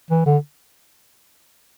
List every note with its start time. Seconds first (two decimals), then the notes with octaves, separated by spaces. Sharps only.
0.11 E3
0.26 D3